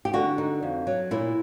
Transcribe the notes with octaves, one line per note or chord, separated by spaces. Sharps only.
G4
D3 F#4
D#4
F2
F#3
A#2 E4